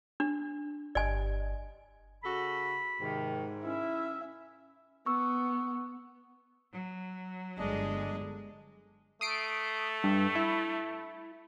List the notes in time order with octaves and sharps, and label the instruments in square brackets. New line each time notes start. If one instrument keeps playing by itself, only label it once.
[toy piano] D4
[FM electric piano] G1 G4 D#5 [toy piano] D5 G#5
[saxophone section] C#3 F#4 A4 [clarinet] B5
[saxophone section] G#2 [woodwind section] C3 D#3
[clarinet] C#4 [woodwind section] E4 [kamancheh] E5
[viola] B3 [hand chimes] C#6 E6
[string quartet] F#3
[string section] G1 [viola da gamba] G#3 [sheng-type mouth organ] D4 D#5
[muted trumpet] A3 [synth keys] D#6 C7 D7
[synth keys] G2
E4